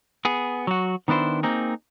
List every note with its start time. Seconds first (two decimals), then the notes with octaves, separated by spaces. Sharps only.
0.25 B3 G#4
0.67 F#3 F#4
1.08 D#3 B3 D4 E4 C5
1.43 A#3 C4 D#4 G#4